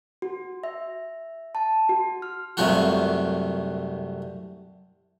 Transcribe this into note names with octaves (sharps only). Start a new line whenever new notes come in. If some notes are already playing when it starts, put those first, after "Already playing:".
F#4
E5
A5
F#4
F6
C2 F#2 C3 A3 F4 F#4